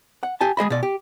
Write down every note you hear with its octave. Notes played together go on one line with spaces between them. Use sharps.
F#5
G4 G#5 A5
G#3 G#4 D#5 B5
B2 D5
G4